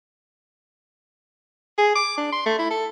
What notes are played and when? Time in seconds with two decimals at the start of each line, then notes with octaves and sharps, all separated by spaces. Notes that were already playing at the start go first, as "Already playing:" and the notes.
1.78 G#4
1.95 D6
2.17 D4
2.32 C6
2.46 A3
2.59 E4
2.71 A4